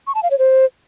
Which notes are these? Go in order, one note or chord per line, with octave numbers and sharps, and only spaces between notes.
C#6
A5
F5
C#5
C5